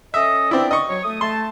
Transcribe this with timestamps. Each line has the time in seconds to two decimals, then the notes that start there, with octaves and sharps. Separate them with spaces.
0.14 C#4 A4 D#5 E5
0.51 B3 C4 D4 E4 D5
0.71 D#5 C#6
0.88 F#3 C#5
1.03 A3 D#6
1.21 A3 A5 C6